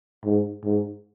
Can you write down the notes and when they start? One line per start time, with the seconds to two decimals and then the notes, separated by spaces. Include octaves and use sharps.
0.25 G#2
0.64 G#2